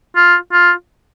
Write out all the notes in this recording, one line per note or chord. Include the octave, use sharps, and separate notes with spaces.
F4
F4